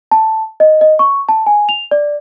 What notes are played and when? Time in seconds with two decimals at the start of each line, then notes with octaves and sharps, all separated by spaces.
0.11 A5
0.60 D#5
0.81 D#5
0.99 C#6
1.29 A5
1.46 G#5
1.69 F7
1.91 D5